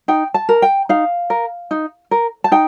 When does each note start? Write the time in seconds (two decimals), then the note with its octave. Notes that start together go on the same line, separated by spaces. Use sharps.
0.08 D#4 G5
0.34 A5
0.49 A#4
0.62 G5
0.89 D#4 F5
1.30 A#4
1.71 D#4
2.11 A#4
2.44 A5
2.52 D#4 G5